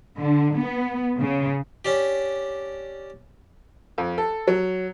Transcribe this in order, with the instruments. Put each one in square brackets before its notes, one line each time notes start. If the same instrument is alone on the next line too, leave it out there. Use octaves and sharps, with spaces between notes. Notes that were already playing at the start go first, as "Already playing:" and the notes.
[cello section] D3
B3
C#3
[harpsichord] C#4 D4 G4
[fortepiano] F2
A4
F#3